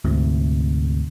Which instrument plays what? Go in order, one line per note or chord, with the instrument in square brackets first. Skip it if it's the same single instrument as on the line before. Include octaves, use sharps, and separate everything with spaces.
[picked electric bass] D2 G#2 C3